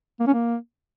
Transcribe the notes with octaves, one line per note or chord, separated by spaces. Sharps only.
A#3
C#4
A#3